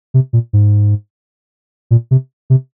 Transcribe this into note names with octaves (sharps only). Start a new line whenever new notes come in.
C3
A#2
G#2
A#2
C3
C3